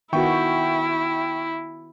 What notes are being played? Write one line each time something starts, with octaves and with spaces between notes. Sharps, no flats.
D#3 B3 E4 F#4 E5 G5 C#6